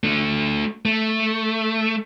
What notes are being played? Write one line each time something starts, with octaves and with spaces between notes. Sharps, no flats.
A3 D4
A3